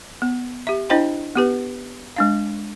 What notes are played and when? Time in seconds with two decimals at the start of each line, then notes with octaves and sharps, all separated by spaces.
0.22 B3
0.67 G4 E5
0.90 D4 E4 C5 D#5 G5 B5
1.36 B3 G4 B4
2.16 G#3 D4 F5